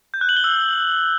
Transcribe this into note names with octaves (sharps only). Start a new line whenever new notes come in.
G6
F#6
F#7
G7
E6